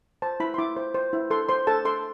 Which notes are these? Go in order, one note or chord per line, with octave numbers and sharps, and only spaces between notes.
C5 A5
E4 B5
C6
E4 D6
C5
C5
E4
A4 C6
C5 C6
A4 A5
A4 C6